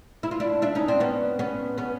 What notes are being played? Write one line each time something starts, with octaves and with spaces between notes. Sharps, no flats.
E4
F4
D4 E4
D4 E4
C#4 D#4
C4 D4
B3 C#4
B3 C#4
B3 C#4